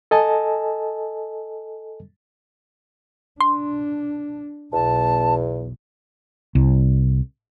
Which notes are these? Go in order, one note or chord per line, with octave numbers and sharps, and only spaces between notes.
A4 D#5 G#5 A5
D4 C6
B1 E2 A5
C2